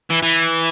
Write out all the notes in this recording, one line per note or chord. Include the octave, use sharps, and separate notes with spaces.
E3
E3